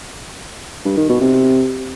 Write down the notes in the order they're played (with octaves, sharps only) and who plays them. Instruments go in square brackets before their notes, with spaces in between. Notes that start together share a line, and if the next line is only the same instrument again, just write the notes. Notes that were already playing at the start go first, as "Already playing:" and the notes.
[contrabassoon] G2
D#3
B2
C3